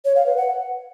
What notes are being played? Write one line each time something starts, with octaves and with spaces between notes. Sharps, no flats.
C#5
F5
B4
F#5